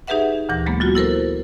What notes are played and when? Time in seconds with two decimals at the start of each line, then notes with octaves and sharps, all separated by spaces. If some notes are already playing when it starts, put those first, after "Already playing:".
0.07 D#4 G4 G#4 B4 E5 F#5
0.49 D2 A#2 E3 A#6
0.66 F#3 G#3 A#3 B3
0.80 F#3 F4 F#4
0.95 E4 A4 A#4 C5